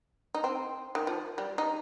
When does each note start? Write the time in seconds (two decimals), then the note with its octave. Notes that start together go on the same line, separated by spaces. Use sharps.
0.34 D#4
0.44 C4
0.95 D#3
1.07 F3
1.38 G3
1.58 D#4